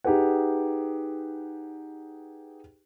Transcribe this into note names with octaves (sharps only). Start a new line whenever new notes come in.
D#4 G4 G#4 B4 F#5